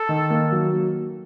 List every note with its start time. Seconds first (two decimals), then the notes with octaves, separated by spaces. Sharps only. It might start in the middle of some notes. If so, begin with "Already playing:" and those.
Already playing: A4
0.09 D#3
0.30 A#3
0.52 F#3